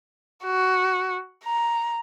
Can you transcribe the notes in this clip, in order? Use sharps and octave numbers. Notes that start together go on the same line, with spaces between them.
F#4
A#5